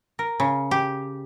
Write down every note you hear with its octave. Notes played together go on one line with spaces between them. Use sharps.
A#4
C#3
G4